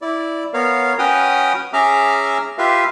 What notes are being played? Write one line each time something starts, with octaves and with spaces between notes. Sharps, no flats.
E4 D5
B3 A#4 C#5 F5
C#4 F#4 B4 G5 D#6 F6
C#4 G#4 E5 A#5 D6 F6
F4 G4 B4 E5 F5